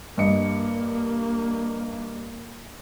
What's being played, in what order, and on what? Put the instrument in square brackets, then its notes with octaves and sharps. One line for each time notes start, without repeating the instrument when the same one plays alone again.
[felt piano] G2 D#5 C#7 [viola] A#3